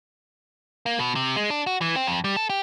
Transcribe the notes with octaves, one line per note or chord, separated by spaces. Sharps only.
A#3
B2
C3
G#3
D4
F#4
E3
C4
F2
G3
A4
G4